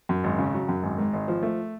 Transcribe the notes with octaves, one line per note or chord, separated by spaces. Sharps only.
F#2
G#1
C#3
F#3
F#2
G#1
G#2
G#1
F3
A3